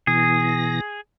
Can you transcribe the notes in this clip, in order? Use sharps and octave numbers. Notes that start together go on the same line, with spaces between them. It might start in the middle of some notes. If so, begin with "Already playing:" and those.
B2 E3 G#4 A#6